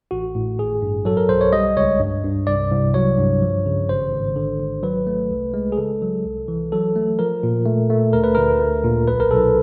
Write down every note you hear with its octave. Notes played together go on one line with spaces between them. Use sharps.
A1 F#4
A2
G#1 G#4
G2
F#3 A4
A#4
B1 C5
C#5
G3 D#5
C#2 C#5
G2
G2
C2 D5
C2
F#3 C#5
G2
F3
C#3
G#1 C5
G#1
D3
G#1
F#3 B4
A3
C2
G#3
G#4
C#3 A4
F#3
C2
E3
F#3 A4
A3
F3 A#4
A#2
A3
A3
D2 A#4
B4
D2 A#4
A3
A#2
B1 B4
A#4
B1 A4